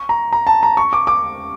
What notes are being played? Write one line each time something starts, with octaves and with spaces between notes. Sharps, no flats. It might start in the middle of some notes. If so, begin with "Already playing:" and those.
Already playing: C#6
A#5
A#5
A5
A#5
C#6
D6
D6